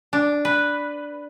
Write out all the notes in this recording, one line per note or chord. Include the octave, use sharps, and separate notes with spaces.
D4
B4